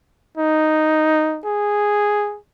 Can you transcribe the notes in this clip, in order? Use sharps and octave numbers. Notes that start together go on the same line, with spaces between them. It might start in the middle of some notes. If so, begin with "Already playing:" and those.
D#4
G#4